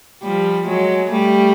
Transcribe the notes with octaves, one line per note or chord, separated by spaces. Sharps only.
F3 G3
F#3 G#3
G3 A3